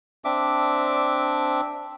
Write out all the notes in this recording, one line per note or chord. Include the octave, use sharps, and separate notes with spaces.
C4 D4 E5 D6